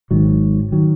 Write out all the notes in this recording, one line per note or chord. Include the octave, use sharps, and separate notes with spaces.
G#1 G#2 D#3 F#3
D#3 F#3